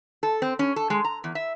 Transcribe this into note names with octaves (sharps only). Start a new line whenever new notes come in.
A4
C4
C#4
A4
G#3
A#5
E2
E5